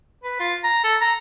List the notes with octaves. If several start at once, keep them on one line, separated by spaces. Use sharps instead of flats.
B4
F4
A#5
A4
A#5